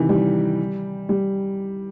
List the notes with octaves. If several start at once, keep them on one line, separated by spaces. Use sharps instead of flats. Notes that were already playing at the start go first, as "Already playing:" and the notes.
Already playing: C3 D#3 E3
G3
G3